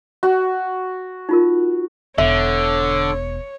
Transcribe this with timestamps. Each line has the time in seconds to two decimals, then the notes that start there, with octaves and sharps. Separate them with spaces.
0.23 F#4
1.29 D#4 F4 A#4
2.18 E1 D3 C#5 E5